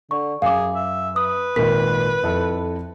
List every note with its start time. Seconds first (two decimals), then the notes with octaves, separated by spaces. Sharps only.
0.11 D3 C#6
0.42 F#2 G#4 F5 D6
0.75 E5
1.16 B4 D#6
1.56 G#1 A#2 A#4 B6
2.23 F2 E4 A4